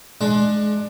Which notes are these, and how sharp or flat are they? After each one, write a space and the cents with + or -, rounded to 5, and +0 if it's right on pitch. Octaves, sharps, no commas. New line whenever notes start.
G#3 +25 D4 +25